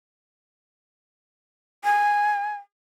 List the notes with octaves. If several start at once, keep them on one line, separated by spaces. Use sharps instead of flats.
G#5